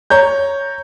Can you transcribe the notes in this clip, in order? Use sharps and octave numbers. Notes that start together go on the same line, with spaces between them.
C#5 A#5 G6